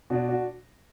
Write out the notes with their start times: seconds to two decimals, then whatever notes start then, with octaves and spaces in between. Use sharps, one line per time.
0.10 B2 D4 F#4
0.28 D4 F#4